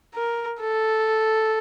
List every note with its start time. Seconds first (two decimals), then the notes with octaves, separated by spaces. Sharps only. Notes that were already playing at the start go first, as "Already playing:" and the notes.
0.15 A#4
0.60 A4